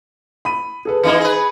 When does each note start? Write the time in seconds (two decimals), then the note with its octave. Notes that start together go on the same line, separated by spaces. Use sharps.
0.45 B5 D#7
0.85 G#4 A4 B4
1.03 E3 A#3 D#4 D#5 C#7
1.20 G#4 B4